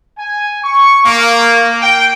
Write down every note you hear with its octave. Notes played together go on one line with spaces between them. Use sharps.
G#5
C#6
A#3
G5